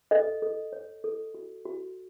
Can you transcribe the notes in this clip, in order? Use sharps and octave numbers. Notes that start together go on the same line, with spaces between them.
A4 D#5
A4
C#5
A4
F#4
F#4